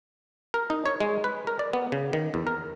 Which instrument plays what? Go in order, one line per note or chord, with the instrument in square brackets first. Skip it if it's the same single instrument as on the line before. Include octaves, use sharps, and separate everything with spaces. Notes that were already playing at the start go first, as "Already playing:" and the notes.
[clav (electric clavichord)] A#4
D#4
C#5
G#3
B4
A#4
D5
B3
C#3
D#3
E2
A#4